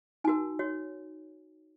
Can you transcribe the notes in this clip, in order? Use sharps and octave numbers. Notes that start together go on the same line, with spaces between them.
D#4 F#4 A#4 G#5
F#4 C#5